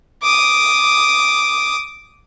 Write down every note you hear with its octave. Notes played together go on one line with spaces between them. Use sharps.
D6 D#6